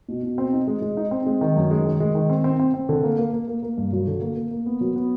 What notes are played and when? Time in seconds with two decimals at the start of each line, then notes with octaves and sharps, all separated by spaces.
0.08 B2
0.23 B2
0.38 C4
0.53 D#4
0.67 G#3
0.82 G#3
0.97 D#4
1.11 C4
1.26 G#3
1.41 D#3
1.56 F#2
1.71 G#3
1.85 D#3
2.00 G#3
2.15 D#3
2.30 C4
2.44 C4
2.59 C4
2.74 C4
2.89 D3
3.03 A#3
3.18 A#3
3.33 A#3
3.48 A#3
3.63 A#3
3.78 G2
3.92 F#3
4.07 D3
4.22 A#3
4.37 A#3
4.51 A#3
4.66 B3
4.81 F#3
4.96 B3